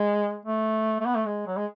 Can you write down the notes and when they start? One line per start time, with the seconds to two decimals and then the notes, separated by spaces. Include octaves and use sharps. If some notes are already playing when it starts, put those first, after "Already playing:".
Already playing: G#3
0.45 A3
1.00 A3
1.05 B3
1.15 A3
1.26 G#3
1.47 F#3
1.56 G#3